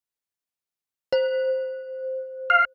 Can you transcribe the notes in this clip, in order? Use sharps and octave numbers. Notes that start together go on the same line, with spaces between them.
C5
F5